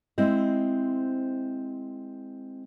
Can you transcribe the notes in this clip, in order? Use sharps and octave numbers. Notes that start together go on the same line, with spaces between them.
G#3 C4 E4 C5 D#5